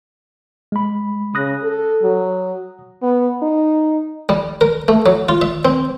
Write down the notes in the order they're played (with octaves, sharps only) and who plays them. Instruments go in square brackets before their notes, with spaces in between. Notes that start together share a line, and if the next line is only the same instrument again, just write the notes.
[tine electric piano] G#3 B5
[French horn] C#3 [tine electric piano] D#6 F#6 A#6
[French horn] A4
F#3
[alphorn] B3
D#4
[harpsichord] G3
A#4
A3
F#3
F4
E5
C4